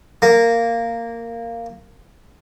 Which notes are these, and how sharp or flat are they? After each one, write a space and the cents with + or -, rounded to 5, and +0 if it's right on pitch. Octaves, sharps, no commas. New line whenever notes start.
A#3 -10